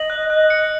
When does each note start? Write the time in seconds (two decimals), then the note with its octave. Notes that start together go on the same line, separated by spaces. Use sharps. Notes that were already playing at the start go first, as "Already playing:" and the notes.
Already playing: D#5 F#7
0.10 F#6
0.30 D#5 F#6
0.50 C#7